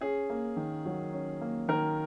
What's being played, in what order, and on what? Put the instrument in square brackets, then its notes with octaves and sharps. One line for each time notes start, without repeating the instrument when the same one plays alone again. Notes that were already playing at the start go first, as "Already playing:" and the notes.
[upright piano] C#4 G#4
A#3
D#3
F#3
C#4
A#3
D#3 A#4